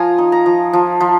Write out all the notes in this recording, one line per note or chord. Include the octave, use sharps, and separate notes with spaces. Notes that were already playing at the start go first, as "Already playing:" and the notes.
Already playing: F3 F4 F5 G#5 A#5
D#4
A#5
F3
F3
F3